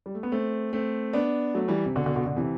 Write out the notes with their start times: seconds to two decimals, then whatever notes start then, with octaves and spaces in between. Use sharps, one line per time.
0.06 G3
0.14 A3
0.23 B3
0.32 A3 C4
0.73 A3 C4
1.13 B3 D4
1.54 F#3 A3
1.68 E3 G3
1.86 C3
1.95 B2 D3
2.06 B2 D3
2.16 B2 D3
2.26 B2 D3
2.36 C3 E3